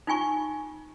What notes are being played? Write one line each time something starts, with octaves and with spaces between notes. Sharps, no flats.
D#4 F4 G#5 C#6